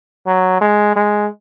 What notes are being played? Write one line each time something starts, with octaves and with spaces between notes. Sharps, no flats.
F#3
G#3
G#3